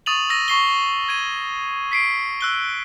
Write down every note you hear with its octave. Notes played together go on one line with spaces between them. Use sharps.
C#6 D#6 A6 D#7 F7 F#7
E6 A#6 D#7
C#6 C7 G7
G#6 D#7
B6 C7 D7
E6 F#6 G7